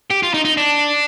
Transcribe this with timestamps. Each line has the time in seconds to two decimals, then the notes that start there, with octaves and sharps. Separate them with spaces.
0.10 G4
0.23 F4
0.34 D#4
0.45 D#4
0.57 D4